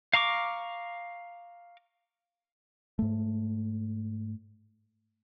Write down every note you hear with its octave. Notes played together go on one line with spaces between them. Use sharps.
F5 A#5 C#6 D6
G#2 A3